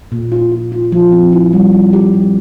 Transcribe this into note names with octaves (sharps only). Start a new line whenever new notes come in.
A#2
F4
F4
F4
F3
C4
E4
G3
G3
G4
G3